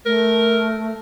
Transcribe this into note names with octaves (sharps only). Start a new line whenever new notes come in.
A3 A#4